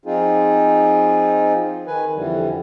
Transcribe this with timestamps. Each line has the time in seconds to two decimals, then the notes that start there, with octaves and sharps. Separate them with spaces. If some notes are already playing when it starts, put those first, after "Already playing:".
0.06 F3 C4 D#4 F4 G#4
1.87 D#3 B4 G#5
2.15 F2 D3 E3 G3